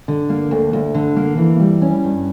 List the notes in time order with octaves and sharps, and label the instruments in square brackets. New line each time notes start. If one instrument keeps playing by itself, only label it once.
[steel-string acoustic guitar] D3
A#3
D2
D2
D3
A#3
E3
G3
C#4
G2